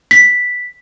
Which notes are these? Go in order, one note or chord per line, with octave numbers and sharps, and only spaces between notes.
B6